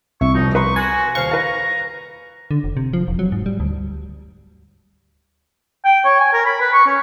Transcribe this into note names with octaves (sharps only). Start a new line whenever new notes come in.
C2 E5 C#6
E1 F3 D#4
B4 A#5 C6 C#6
F#4 G#5
D#1 C5 F5 C#6 F#6
B4 F5 A#5
D3
F1
C3
F3
E1
F#3
G#2
G3
D2
G5
C#5
G#5
A#4
B5
B4
C#6
C#4